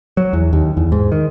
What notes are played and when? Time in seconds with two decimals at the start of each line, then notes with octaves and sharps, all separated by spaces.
0.17 F#3
0.33 E2
0.53 D#2
0.77 E2
0.92 G#2
1.12 D#3